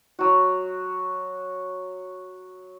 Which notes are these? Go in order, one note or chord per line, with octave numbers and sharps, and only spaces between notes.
F#3 F#4